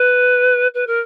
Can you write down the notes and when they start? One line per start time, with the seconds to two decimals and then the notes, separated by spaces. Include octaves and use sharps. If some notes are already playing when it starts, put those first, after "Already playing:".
Already playing: B4
0.74 B4
0.87 A#4